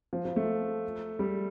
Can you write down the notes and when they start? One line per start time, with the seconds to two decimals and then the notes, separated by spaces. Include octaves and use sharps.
0.13 F3
0.25 F3
0.36 A3
1.19 G3